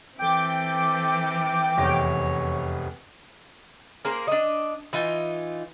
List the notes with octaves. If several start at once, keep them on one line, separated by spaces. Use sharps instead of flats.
E3 C4 A4 G5 D6
F1 E2 C#5 A#6
A#3 G#4 A#4 C5
D4 D#5
E3 D#4 F4